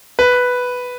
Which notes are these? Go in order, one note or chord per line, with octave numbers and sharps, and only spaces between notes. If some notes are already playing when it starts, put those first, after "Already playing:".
B4